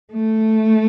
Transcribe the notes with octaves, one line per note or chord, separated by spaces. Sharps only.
A3